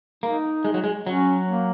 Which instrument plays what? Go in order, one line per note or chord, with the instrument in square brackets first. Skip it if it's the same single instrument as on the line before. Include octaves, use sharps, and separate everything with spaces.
[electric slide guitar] A#3 [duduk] D#4
[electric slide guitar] G#3
F#3
G#3
[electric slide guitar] F#3 [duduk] C#4
[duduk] A#3